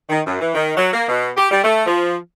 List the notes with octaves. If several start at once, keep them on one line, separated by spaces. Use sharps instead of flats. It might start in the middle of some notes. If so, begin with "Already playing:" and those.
D#3
F#2
E3
D#3
F#3
A#3
B2
G4
G3
A3
F3